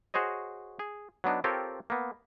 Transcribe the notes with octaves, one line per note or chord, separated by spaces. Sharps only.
F#4 G#4 C5 C#5 D#5
G#4
F#3 B3 D4 D#4
C4 F4 G4 A4 A#4 C#5
A#3 B3